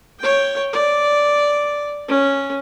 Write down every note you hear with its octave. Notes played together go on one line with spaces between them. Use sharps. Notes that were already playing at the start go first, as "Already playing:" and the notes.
C#5 G5
D5
C#4